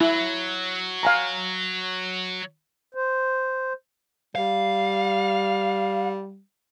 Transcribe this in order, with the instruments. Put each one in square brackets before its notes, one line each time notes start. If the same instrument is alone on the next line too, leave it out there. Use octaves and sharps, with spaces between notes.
[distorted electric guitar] F#3 [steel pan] E4
[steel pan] F5 G#5 A#5
[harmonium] C5
[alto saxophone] G3 [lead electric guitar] F5